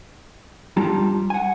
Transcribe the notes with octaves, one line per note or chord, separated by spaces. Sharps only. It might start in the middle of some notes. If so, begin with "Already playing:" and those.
G2 G3 F4 G4 A5 A#5
F#5 G#5